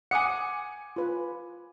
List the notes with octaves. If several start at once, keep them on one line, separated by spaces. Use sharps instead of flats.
F#5 G#5 D6 D#6 C#7
F4 B4